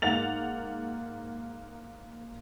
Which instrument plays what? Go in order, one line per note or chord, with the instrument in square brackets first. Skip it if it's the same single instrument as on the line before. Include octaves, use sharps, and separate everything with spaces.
[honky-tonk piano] G#2 A#3 F#5 A6 F7